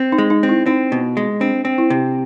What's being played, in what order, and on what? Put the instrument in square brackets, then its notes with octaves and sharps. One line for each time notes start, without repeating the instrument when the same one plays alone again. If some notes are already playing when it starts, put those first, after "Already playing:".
Already playing: [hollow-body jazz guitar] C4
[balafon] D#4
[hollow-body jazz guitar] G#3
[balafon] D#4
[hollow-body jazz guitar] C4
[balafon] E4
[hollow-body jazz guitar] C4 [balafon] D#4
[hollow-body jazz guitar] B2
G#3
[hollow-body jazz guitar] C4 [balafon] D4
[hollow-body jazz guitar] C4
[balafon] E4
[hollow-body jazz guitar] C3